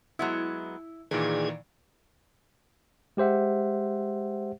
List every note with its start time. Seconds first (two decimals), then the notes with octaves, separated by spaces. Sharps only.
0.19 F#3 G#3 B3 E4
1.11 A#2 D#3 E3 G#4 A#4 D5
3.17 G#3 G4 C5 E5 F#5